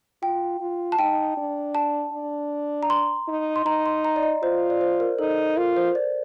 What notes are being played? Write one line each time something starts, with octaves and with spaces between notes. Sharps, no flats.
F4 G5
F4
A5
D#4 G5
D4
A5
D4
A#5
C6
D#4
C6
D#4 A#5
C6
A#5
D5
D#5
F4 C5
D5
C5
A#4
D#4 A4
F4 A#4
C5
D5